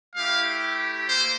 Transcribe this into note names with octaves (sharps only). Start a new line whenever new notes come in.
A3 E4 G4 F5
A#3 C5